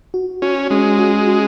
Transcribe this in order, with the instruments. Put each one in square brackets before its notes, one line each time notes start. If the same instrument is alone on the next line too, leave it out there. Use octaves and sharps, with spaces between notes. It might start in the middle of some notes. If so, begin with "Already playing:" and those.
[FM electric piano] F#4
[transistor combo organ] C#4 [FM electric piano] F#4
[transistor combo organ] G#3 [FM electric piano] C#4
[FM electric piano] F#4
F#4